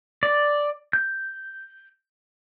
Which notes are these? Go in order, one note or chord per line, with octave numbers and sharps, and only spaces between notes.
D5
G6